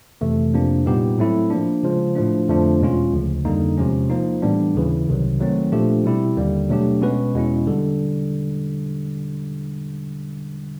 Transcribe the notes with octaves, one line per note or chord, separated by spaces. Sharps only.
F2 C3 E3 A3
F2 C3 F3 A#3 D4
A#2 G3 B3 D#4 G4
A2 F#3 A3 C4 E4
F3 A#3 D4
C#3 F3 G#3
A2 F3 A3 D4
F2 D3 F3 A3 D4
E2 B2 G#3 C#4 F4
D2 C#3 F3
F2 D3 G3 A#3 D#4
E2 C3 F3 G#3 C#4
F3 A#3 D#4
A2 E3 G3 B3 D4
D#2 C#3 E3
C2 C3 D#3 F#3
D#3 F#3 A3 C4
A#2 F3 A3 D4 G4
B2 G3 C4 E4 G4
D#2 D3 G3 A#3
B2 F#3 A3 D4 G4
B2 G#3 C#4 F#4 B4
E2 B2 G#3 C#4 E4
D3 G3